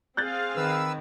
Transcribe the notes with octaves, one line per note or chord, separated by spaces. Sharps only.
C4 G#4 F5 F#6 G6 A6
D#3 B4 E6